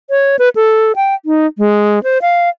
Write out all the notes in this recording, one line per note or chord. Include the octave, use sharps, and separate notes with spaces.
C#5
B4
A4
G5
D#4
G#3
C5
F5